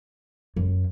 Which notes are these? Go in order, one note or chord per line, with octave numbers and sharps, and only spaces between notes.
F#2